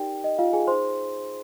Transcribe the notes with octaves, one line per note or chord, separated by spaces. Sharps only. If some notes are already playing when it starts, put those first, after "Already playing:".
Already playing: D#4 G4 A#4 D5 G5
D#5
F4 F5
G#4 G#5
D#4 G#4 C5 C6